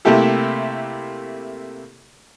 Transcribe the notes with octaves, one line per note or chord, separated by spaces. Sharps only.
C3 A3 A#3 E4 G4 A4